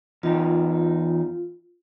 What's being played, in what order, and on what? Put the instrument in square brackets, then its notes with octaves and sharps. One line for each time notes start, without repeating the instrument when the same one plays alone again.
[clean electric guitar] E2 D#4 [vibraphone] F4